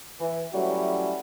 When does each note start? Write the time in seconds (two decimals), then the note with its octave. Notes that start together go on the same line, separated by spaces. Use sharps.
0.21 E3
0.54 F#3 G3 A3 C#4 E4 F#4